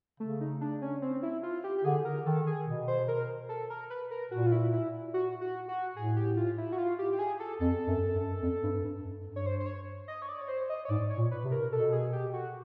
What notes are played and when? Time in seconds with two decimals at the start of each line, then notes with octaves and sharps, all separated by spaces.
0.20 C#3 A3
0.41 D#4
0.61 D4
0.82 C#4
1.02 C4
1.23 E4
1.43 F4
1.64 G4
1.78 G4
1.84 D3 G#4
2.05 A#4
2.26 D#3 A4
2.47 G#4
2.67 B2
2.88 C5
3.08 A#4
3.49 A4
3.70 A#4
3.90 B4
4.11 A#4
4.31 A#2 F#4
4.46 F4
4.52 E4
4.73 E4
5.14 F#4
5.41 F#4
5.68 F#4
5.96 A2 G#4
6.16 G4
6.37 F4
6.58 E4
6.72 F#4
6.78 F4
6.99 G4
7.13 G4
7.19 G#4
7.40 A4
7.60 F2 A4
7.88 F#2
8.15 F#2
8.42 F2
8.63 G2
8.84 G2
9.04 F#2
9.25 G2
9.36 C#5
9.46 C5
9.60 C5
9.66 C#5
10.08 D#5
10.22 C#5
10.28 D5
10.41 C#5
10.48 C5
10.69 D#5
10.85 C#5
10.90 G#2 D5
11.10 C#5
11.17 A#2
11.31 B4
11.44 C3
11.51 A#4
11.71 B2 A4
11.92 G#4
12.13 G4
12.33 F#4